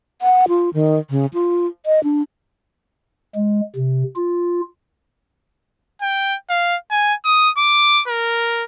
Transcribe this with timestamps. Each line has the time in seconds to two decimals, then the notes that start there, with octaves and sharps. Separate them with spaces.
0.22 F#5
0.49 F4
0.74 D#3
1.10 C#3
1.34 F4
1.86 D#5
2.04 D4
3.35 G#3
3.76 C3
4.16 F4
6.02 G5
6.49 F5
6.91 G#5
7.25 D#6
7.58 D6
8.08 A#4